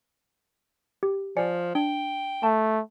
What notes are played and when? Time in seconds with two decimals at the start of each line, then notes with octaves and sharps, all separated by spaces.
1.03 G4
1.37 F3 D5 G#5 C#7
1.75 D4 G5
2.43 A3 A5